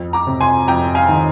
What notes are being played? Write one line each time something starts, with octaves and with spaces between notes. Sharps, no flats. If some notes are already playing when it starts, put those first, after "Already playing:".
Already playing: F2
A#5 D6
C3
G#5 C6
F2 G5 A#5
F5 G#5
D#3